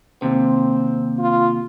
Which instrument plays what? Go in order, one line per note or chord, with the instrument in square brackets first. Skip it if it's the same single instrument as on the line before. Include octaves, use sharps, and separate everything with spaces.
[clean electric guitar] D#2 C3 [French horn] C4
[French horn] F4